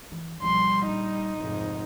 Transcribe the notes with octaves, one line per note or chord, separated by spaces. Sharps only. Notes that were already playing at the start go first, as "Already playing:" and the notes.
E3
B1 F3 G3 C6
A#1 D#4
F1 G#2